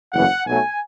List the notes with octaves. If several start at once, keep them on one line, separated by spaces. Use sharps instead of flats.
F#1 E2 C#3 E3 F#5
B1 B2 F#3 A3 G#5